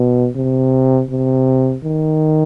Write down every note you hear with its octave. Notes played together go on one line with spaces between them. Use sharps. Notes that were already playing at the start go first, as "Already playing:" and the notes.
Already playing: B2
C3
C3
D#3